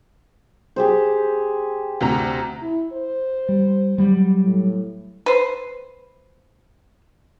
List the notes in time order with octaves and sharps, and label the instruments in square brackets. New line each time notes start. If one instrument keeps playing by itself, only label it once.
[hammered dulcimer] G4 G#4 C5
[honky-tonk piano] D2 C3 A#5
[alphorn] E4
C5
[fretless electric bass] G3
F#3 G3
[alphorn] A2
[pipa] B4 C5